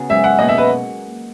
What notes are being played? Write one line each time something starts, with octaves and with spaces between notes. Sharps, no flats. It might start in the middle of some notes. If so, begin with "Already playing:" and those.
Already playing: C#3 B3 F#4
G#2 F#3 C#4 G#4 E5
F#5
B2 A#3 D#4 F#4 D#5
E5
B4